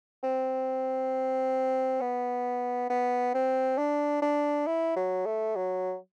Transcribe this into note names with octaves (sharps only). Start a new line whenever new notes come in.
C4
B3
B3
C4
D4
D4
E4
F#3
A3
F#3